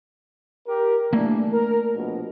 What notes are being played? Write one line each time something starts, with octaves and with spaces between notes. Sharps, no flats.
G4 A#4
E3 A3 A#3 D4
A#4
A#1 B2